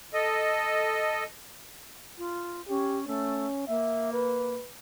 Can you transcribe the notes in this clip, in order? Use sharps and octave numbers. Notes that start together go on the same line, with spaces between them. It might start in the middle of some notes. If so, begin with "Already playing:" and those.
A4 D#5
F4
C#4 G4
A3 C#4
A#3 E5
B4